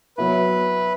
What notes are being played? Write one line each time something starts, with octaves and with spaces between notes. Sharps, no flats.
F#3 B3 E4 B4